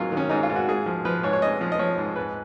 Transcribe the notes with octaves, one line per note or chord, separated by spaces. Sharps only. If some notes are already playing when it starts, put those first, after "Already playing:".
Already playing: G#2 D#3 F#3 F4
D#3
C#4
G#2 D#4
F4
G#2
F#4
G#2 G#4
F3
F3 B4
G#2 C#5
C#5
G#2 D#5
F3
D#5
F3 C#5
G#2
G#2 B4